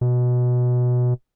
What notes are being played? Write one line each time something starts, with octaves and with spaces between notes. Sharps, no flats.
B2